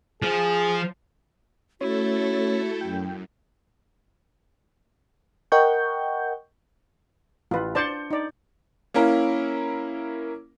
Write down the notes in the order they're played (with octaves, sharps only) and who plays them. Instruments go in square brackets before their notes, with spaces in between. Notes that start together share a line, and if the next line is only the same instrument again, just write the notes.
[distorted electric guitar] F3 [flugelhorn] G#4
[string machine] A3 A4 [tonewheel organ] C#4 C#5 [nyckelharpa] E4 [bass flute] F#4
[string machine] F#2 [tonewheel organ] G5
[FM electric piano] A#4 D#5 F#5 G5 C#6 G6
[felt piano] A1 [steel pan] F4 B4
[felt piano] D4 G6 C#7 [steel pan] C5 D5 A5
[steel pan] D#4 D5
[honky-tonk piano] A#3 C#4 E4 A#4